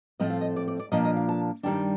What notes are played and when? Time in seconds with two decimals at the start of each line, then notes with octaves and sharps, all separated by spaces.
0.20 A2 F3 A3 C4 D#5
0.30 F5
0.41 D#5
0.56 D5
0.68 D5
0.79 D5
0.92 A#2 F3 A#3 D4 D#5
1.05 D#5
1.17 F5
1.29 A5
1.63 G2 D#3 G3 A#3 D4 G5